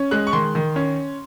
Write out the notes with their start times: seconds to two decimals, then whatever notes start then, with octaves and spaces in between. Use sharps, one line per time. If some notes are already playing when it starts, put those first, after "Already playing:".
Already playing: C#4
0.11 G#3 F#6
0.27 C#6
0.33 D#3 C6
0.55 D#3
0.76 C#4